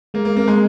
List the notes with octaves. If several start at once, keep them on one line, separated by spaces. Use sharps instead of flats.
G#3 A#3
A#3
A#3 C4
G#3